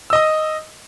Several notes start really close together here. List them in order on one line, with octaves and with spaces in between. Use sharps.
E6 D#5 D#6